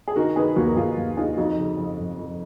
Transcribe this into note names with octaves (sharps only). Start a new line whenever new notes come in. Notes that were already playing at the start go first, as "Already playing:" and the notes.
G#4
D#3 F#4 A#4
D#3 G#4 B4
D#2 F#4 A#4
A#4
D#2 F4 G#4
D#2
D#3 F4 G#4
F2 D#4 F#4
C#3
F2
F2
F2